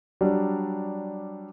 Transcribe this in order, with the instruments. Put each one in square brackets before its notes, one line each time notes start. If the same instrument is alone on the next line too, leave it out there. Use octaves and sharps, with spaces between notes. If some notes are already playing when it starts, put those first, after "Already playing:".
[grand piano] F#3 G3 D4